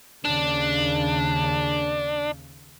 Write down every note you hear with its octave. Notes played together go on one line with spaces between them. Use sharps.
D#2 C#3 D4